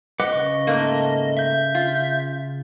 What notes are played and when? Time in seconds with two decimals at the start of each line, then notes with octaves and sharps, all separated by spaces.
0.20 B4 D#5 F#5 D6
0.33 C#3 B4 C#6
0.67 G#2 A3 A#3
1.37 E5 G6
1.75 F4